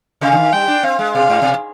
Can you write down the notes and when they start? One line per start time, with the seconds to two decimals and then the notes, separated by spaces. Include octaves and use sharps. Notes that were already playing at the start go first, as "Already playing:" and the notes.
0.21 C3 F5
0.32 D3
0.37 D#3
0.53 G3 G5
0.68 D4
0.83 C4 F5
0.99 G#3
1.14 B2 F5
1.30 G#2
1.42 B2